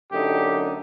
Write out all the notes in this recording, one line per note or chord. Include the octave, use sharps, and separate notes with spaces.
F#2 D3 A3 D#4 G4